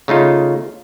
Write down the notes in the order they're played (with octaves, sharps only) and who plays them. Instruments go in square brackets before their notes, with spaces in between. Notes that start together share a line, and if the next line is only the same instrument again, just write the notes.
[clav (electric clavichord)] C#3 A3 D#4 F4